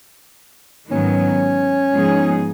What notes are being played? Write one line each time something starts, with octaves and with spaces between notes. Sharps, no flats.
G#2 D#3 F#3 B3 C#4
G#2 F3 B3 D#4 G#4